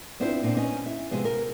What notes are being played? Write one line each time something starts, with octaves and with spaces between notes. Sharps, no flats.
B3 C4 D4 E4 F4 C5
A#2 C4 D4
B3 C#4 D#4 D#5
E4 E5
C3 F3 G#3 B3
A#4